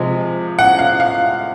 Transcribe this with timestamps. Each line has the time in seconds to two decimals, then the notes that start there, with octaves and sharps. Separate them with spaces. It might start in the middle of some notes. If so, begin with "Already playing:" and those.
Already playing: C3 F3 G#3
0.59 F#5
0.79 F5
1.00 F5